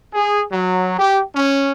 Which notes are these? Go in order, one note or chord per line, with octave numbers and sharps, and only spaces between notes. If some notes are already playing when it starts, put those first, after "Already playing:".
G#4
F#3
G4
C#4